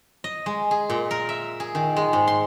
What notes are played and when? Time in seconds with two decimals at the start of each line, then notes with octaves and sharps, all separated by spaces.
0.24 D#5
0.46 G#3
0.71 G#4
0.90 A#2
1.11 A#4
1.29 E5
1.60 G#4
1.75 D#3
1.96 G#3
2.13 G#2
2.27 C6